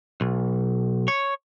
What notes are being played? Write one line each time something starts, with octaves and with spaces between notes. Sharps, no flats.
B1
C#5